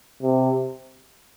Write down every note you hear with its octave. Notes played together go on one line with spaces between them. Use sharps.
C3